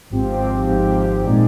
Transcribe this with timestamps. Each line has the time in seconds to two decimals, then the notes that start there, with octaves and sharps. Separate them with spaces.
0.10 G#1 G#2 F3 C4 G4
0.67 G#1 G#2 F3 C4 G4
1.24 A#2 G#3 D#4 G#4 D5